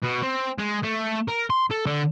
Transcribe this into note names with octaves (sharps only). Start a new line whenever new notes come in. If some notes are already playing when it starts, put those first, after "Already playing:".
B2
C4
G#3
A3
A#4
C6
A4
D3